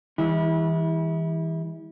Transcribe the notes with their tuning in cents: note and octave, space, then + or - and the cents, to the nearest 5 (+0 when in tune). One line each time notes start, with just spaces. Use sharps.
E3 -20 G3 +45 E4 -30